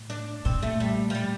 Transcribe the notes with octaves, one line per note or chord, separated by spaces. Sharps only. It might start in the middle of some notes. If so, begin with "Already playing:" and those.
Already playing: A2
D4
A#2 C4
A3
G3
F3
G3